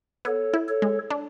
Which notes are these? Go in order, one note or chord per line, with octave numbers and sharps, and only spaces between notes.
B3 A4 C#5
E4
A4 C#5
G#3
D4